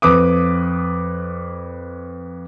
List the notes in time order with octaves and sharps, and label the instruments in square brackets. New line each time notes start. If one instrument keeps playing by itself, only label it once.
[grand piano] F2 B4 D6 D#6